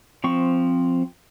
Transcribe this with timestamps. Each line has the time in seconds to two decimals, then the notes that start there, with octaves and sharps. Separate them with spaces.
0.24 F3 C4 C#6